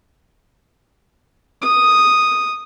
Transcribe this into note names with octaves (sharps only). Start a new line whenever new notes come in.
D#6